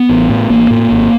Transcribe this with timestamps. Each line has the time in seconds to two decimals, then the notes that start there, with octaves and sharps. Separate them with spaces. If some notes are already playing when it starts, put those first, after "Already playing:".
Already playing: B3
0.09 A1
0.29 A2
0.50 A1 A#3
0.70 A2
0.90 G#1